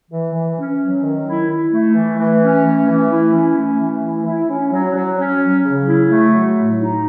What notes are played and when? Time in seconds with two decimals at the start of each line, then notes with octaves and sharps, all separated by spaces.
0.11 E3
0.34 E3
0.58 C#4
0.80 F#3
1.03 D#3
1.27 E4
1.49 E4
1.72 A3
1.95 E3
2.19 E3
2.42 C#4
2.65 A3
2.88 E3
3.11 E4
3.34 C#4
3.57 A3
3.80 E3
4.03 E4
4.26 E4
4.50 C#4
4.72 F#3
4.95 F#3
5.18 C#4
5.41 F#3
5.64 C#3
5.87 E4
6.11 A3
6.33 F#3
6.56 A2
6.79 D#4